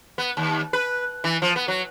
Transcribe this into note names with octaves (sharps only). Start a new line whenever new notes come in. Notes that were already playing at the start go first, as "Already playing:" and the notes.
B3
D#2
B4
E3
F3
B3
F#3